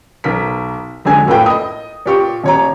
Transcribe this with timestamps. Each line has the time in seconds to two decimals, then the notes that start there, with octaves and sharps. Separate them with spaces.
0.24 B1 A#4 B6
1.05 F2 D3 F#3 G#3 G#5 G#6
1.27 A2 A#3 F4 A4 B4 G5
1.46 D#5 D#6
2.06 A#2 G4 C#6
2.44 D#1 C#5 A#5